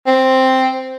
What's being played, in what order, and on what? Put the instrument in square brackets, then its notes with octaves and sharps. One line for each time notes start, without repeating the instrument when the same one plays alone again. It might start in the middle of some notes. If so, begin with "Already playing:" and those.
[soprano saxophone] C4